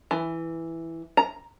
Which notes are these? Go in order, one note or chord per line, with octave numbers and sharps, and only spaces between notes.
E3
A#5